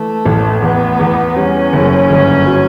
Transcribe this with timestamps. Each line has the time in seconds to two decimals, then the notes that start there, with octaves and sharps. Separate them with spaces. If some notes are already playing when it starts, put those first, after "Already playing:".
Already playing: E3 A3
0.26 A1
0.62 E2 B3
0.99 E2
1.36 G3 C#4
1.73 F#1
2.10 G1
2.46 F#3